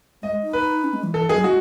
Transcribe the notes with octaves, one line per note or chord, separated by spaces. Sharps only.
G#3 D#5
D#4
B4
C#4
G#3
E3
E3 A4
F#3 G#4
G#3 F#4